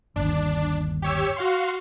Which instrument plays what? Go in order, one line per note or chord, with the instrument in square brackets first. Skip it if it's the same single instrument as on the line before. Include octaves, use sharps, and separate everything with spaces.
[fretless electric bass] G1 D#2 [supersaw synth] D4
[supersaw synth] G4 C#5 E6
F#4 F5 C6